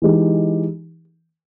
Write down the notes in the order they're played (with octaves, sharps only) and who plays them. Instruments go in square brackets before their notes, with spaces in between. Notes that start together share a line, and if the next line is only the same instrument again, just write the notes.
[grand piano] E3 G#3 D#4 G4